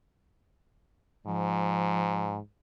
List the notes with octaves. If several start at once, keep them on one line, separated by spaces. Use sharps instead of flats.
G#2 F3